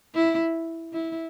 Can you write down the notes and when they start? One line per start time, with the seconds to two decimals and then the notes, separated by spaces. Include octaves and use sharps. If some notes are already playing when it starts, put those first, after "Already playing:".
0.15 E4
0.93 E4